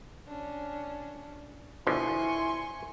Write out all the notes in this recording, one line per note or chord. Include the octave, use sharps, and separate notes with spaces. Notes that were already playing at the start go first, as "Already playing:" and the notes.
C#4 D4
B2 D3 F3 E4 G#5 C6 C#6